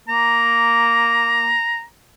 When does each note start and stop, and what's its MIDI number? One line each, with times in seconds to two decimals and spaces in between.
0.08 1.55 58
0.08 1.83 82